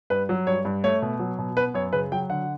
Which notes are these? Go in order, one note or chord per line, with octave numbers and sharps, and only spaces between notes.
G2 B4
F#3
G2 C#5
G2
A3 C#5
B2
F#3
B2
B3 B4
F#2 C#5
C#3 B4
F#3 G5
D3 F#5